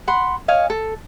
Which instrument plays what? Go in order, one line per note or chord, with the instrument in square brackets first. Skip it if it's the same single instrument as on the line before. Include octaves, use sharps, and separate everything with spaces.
[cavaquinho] F#5 B5 C6
C#5 D#5 F5 G#5
A4